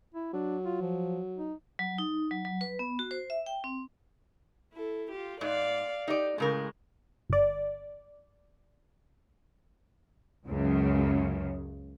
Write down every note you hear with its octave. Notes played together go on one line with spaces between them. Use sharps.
E4
F#3 D4
F4
F3
D#4
F#3
D#4
F#3
F#3
B4
B3
F#4
C5
E5
G5
C4
E4 A4
F4 G4
G#2 D5 F5
D#4 G4 D5
A2 C#3 G#3 A#4
G1 D5
C#2 F#2 C#3